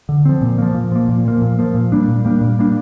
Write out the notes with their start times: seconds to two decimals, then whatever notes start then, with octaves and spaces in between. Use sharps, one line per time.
0.09 D3
0.25 F3 C4
0.41 A#2
0.58 F3 A#3
0.74 A#2
0.92 F3 A#3
1.09 A#2
1.25 F3 A#3
1.42 A#2
1.59 F3 A#3
1.75 A#2
1.92 G3 A#3 D4
2.08 A#2
2.25 G3 A#3 D4
2.41 A#2
2.59 G3 A#3 D4